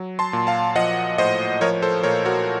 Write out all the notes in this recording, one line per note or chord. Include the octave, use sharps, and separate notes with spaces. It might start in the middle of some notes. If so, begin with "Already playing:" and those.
Already playing: F#3
A5 C6
A#2
F5 A5
F3 D#5 F#5
A2 C5 D#5
F3 A#4 C#5
A4 C5
A#2 A#4 C#5
F#4 A#4